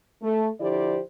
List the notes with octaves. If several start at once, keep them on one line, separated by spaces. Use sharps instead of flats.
A3
D3 F3 E4 G4 C5 D5